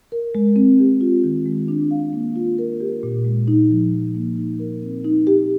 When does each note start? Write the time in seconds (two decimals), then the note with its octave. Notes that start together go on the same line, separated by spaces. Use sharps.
0.12 A#4
0.35 G#3
0.56 C4
0.79 G4
1.01 F4
1.24 D#3
1.46 G#3
1.68 D4
1.91 F5
2.13 A#3
2.36 F4
2.58 A#4
2.81 G4
3.03 A#2
3.25 G#3
3.48 D#4
3.70 F3
3.92 F3
4.15 A#3
4.38 D#4
4.59 A#4
4.82 C4
5.05 D#4
5.27 G4